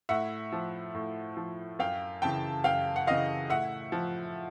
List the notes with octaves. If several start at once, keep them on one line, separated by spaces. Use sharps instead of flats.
A2 E5 F#5
F3
A2
F3
F#2 F5 G5
C#3 E3 G5 A5
F#2 F5 G5
F#5
C#3 E3 D#5 F5
A2 E5 F#5
F3